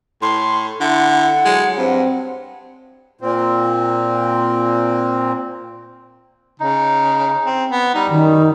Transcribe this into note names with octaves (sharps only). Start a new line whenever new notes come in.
A2 C6
D3 E4 F#5
F#3 G#3
G2 C4
A#2 C4
C#3 D#4
C4
B3
G3 D#4
F#2 D#3